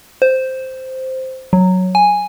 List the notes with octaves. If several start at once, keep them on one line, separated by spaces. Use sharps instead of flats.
C5
F#3
G#5